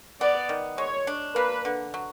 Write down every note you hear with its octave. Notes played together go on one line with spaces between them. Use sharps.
B3 D5
D#3
G#3 C#5
D4
A#3 B4
D3
F#3